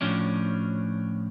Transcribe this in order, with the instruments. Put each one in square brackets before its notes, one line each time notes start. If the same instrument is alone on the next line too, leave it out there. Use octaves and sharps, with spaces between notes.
[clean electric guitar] A2 F3 C#4 D4